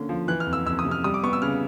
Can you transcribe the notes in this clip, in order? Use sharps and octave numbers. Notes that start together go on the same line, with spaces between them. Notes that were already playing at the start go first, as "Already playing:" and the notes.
Already playing: D3 A#3 C#4
F3
E3 F#6
F6
F2
E6
F2 E6
D#6
C3
F6
G3 D#6
D6
B3 C#6
E6
C#3 F6